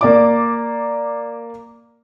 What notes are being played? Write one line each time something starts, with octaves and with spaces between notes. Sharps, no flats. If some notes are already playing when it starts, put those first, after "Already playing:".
A#3 D5 D6